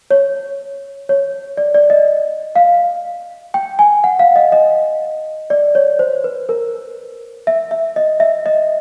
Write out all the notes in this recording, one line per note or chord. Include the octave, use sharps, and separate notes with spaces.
C#5
C#5
D5
D5
D#5
F5
G5
G#5
F#5
F5
D#5
D#5
D5
C#5
C5
B4
A#4
E5
E5
D#5
E5
D#5